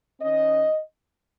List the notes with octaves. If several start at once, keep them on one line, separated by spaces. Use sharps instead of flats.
D#3 C#4 D#5